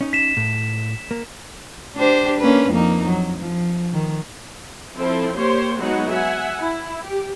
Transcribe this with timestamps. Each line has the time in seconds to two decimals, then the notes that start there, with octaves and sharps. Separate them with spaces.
0.01 C#4 D#4
0.13 B6 E7
0.37 A2
1.11 A#3
1.96 D4 G4 C5
2.40 A#3 C#4 B4
2.70 F2 A#3 D#4
3.07 F#3
3.39 F3
3.93 D#3
4.96 F3 C4 E4 A4 C5
5.36 A#3 G4 C5 C#5 C6
5.78 F#3 G#3 B3 D#4 F#4 F#5
6.11 E5 F#5 G#5
6.56 E4
7.04 G4